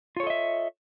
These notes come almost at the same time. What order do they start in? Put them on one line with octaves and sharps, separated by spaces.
F4 C#5 A4 D#5 E5